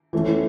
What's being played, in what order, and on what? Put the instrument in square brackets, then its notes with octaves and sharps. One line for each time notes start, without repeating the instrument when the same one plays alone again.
[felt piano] E3 A3 C#4